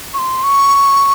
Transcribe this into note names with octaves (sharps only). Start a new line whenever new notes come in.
C#6
C6
C#6